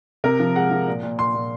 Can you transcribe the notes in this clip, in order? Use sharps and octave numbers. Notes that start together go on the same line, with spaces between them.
C3 A#4
F3
G#3 F#5
F3
A#2
A#2
A#2 C6
A#2